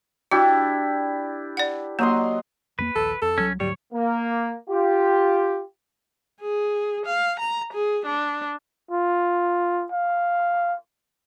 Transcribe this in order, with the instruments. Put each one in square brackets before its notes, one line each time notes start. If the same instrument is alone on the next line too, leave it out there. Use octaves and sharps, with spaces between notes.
[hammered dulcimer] D4 E4 G4 [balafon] F#4
[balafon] D5 F#5
[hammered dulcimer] F#3 D#5 C6 [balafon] A#3
[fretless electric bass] F2 G#3 A#3 [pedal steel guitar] B4
[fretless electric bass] A#1 D#2 [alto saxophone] A4
[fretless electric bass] F2 [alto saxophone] A4
[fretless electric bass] C2 F#3 [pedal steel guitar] C#4
[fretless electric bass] D2 G#2 F#3 [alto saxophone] G3 [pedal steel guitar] C#5
[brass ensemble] A#3
F4 G4
[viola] G#4
F5
A#5
G#4
D4
[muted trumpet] F4
F5